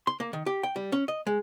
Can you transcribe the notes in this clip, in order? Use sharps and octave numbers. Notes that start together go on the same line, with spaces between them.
C6
A#3
D#3
G4
G5
G3
C#4
D#5
G#3